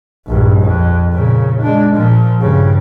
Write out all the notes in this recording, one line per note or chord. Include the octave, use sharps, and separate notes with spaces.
A#1 G2
F2
A#2 C#3
G#3 D4
A#2 F3
G2 C#3